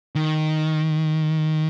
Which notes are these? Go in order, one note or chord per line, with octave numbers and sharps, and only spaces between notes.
D#3